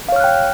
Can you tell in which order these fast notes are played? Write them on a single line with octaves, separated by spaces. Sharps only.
F5 C#5 F6 F#6 G5